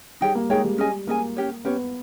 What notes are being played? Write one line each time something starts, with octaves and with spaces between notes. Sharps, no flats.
G3 D#4 G#4 C#5 G5
A#3
G#3 D#4 G#4 C#5 G5
G3
C#4 G#4 D#5 G#5
A#3 C#4 G#4 D#5 G#5
C#4 G4 C#5
B3 C#4 G4 C#5